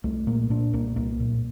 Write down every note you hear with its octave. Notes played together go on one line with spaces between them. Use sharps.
C2 A3
A#2 A#3
A#2 D4
C2 A#3
C2 A#3
A#2